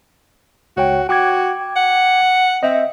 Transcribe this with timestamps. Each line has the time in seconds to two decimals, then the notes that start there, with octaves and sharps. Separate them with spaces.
0.77 C#2 F#4 C#5 G5
1.09 F#4 G5 D6 G#6
1.76 F#5
2.63 C4 D#5 E5